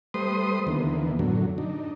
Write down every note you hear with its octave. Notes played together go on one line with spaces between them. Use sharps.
G3 A3 B4 C5 C6 D#6
D#2 D3 E3 A#3 B3
F#2 A2 D3 F#3
D4 D#4